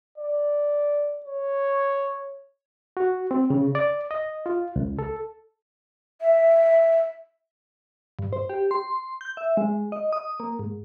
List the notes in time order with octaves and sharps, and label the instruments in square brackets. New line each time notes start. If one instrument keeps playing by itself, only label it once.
[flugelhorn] D5
C#5
[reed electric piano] F#4
C4
C#3
D5
D#5
F4
C#2
A4
[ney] E5
[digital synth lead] G2
C5
G4
C6
G6
E5
G#3
D#5
D#6
A#3
G#2